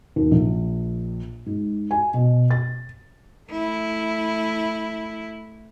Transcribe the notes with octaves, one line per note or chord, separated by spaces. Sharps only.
D#2
A#1
G#2
G#5
B2
A6
A3 E4